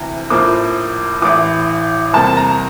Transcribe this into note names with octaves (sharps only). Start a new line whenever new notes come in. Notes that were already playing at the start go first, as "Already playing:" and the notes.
Already playing: D2 C3 E3
A#1 A2 F3 A#3 D6
A1 A2 E3 D6
E2 C3 G3 A#3 A5
A#5